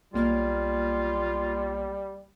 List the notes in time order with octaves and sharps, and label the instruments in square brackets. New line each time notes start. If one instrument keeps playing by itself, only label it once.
[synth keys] B1 A#3 F6 [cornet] G3 [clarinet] F4